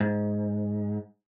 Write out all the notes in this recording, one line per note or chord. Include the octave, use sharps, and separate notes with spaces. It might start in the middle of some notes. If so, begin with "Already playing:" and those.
G#2